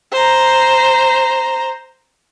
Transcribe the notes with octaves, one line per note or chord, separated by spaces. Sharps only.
C5 A#5